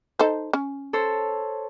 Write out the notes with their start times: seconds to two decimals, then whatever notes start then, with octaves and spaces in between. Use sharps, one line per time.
0.19 D#4 A4 C5
0.53 C#4
0.93 A4 C5 C#5